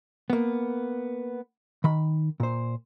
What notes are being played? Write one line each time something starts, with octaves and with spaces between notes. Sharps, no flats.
A#3 B3
D#3 B5
A#2 C5